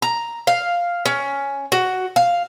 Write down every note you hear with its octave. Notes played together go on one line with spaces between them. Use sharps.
A#5
F5
C#4
F#4
F5